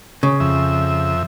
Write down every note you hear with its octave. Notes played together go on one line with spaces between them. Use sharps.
C#3
F2 E5